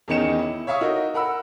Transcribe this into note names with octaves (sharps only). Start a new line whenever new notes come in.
E2 D#3 C#4 D#4 C#7 E7
E4
C#5 E5 F5 C#6 D#6
D#4 F#4 A#4
A#4 F#5 B5 E6